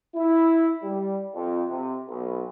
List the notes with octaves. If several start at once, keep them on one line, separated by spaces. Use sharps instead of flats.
E4
G3
F2
C3
B1